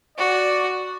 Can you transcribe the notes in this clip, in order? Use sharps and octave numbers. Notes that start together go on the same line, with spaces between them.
F#4 D5